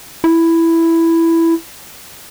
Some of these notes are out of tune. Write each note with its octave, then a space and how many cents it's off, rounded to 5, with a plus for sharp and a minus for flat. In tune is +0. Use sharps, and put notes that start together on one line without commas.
E4 +5